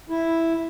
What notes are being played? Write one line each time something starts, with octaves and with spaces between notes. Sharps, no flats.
E4